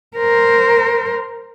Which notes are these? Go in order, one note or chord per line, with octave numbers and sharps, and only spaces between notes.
A#4 C5